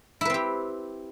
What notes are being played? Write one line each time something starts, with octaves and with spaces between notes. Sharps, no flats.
C4 E4 G4 B4